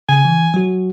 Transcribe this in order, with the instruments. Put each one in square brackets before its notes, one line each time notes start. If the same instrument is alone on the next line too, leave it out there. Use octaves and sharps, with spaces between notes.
[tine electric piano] C#3 [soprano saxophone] G#5
[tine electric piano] E3
F#3 F#4